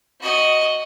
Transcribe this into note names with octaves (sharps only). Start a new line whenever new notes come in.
F#4 D#5